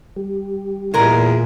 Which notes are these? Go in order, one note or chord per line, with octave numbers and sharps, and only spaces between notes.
G3 G4
E2 A#2 G#3 A#4